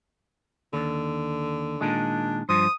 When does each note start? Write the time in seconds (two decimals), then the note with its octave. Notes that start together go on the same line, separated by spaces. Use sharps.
0.73 D#2 D3
1.81 A#2 D#3 G#3 D4
2.49 G2 F3 C5 D#6